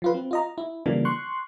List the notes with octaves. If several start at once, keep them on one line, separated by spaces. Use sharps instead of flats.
F3 F4 B4
C4
F4 D#5 A#5
E4
C#3 E3 F3 G3 A#3 D4
C6 C#6 F#6